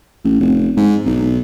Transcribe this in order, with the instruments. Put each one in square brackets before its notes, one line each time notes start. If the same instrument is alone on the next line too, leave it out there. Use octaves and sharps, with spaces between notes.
[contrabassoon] A1
F1
G#2
B1